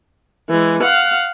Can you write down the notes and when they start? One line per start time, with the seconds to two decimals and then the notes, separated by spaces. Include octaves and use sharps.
0.50 E3 G#3
0.82 F5 F#5